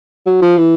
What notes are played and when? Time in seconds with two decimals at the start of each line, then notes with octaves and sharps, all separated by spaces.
0.26 F#3
0.42 F3
0.58 E3